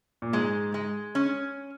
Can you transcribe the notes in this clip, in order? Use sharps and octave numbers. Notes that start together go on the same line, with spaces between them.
A#2
G#2 G#3
G#3
C#4